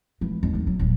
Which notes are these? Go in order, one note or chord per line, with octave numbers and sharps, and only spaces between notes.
E3
D#2
D2
F#3
D#1